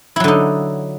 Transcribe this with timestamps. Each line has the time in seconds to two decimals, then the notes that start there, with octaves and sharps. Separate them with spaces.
0.16 E4
0.20 F#3
0.24 D3
0.28 D#4